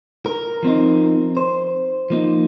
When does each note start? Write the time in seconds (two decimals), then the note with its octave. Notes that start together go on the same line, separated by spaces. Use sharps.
0.26 A#4
0.63 F3 C4 D#4
1.37 C5
2.10 F3 A#3 D#4